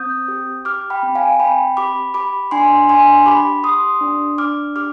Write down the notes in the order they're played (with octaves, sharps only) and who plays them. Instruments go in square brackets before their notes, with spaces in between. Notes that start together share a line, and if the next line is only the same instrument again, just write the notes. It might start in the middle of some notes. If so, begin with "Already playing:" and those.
Already playing: [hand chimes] C4 D#6 G6
G4
G4 D6 F6
G5 B5
C4
F5 G#5
C4 G5 B5
G4 B5 D6
G4 B5 D6
D4 G#5 C6
D4 G#5 C6
G4 B5 D6
G4 C6 D#6
D4
D4 D6 F6
G4 D6 F6